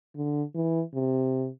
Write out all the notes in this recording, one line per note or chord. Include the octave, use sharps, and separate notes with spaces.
D3
E3
C3